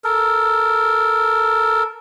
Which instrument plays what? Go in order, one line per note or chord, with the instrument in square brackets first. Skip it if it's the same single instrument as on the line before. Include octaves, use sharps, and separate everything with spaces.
[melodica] A4 A#4